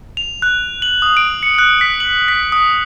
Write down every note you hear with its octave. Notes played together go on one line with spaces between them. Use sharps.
F7
F#6
F#7
D#6
D7
C#7
F#6
B6
F#7
B6
D#6